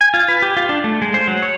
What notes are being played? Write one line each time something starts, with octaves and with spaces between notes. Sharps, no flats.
G#5
F4
B4
G4
F4
D4
A3
G#3
C5
F#3
C#5